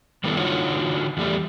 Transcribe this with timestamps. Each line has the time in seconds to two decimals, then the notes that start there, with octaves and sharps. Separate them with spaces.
0.24 D#3 G3 B3 E4 A4
0.37 D3 D#4 F4 F#4 C#5 F#5
1.17 E2 G3 A3